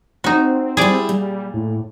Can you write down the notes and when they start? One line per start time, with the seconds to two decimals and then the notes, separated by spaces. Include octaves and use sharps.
0.24 C4 D#4 F#4
0.77 G3 E4 G#4 D5
1.09 A#2 G3
1.54 A2